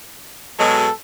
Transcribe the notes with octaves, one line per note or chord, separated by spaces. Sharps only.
B2 F#3 G#3 A4